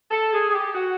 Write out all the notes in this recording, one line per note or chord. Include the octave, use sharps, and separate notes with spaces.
A4
G#4
G#4
G4
F#4